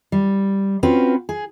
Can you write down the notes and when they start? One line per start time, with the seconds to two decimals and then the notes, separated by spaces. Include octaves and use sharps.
0.12 G3
0.83 C4 C#4 F4 F#4 B4
1.29 G#4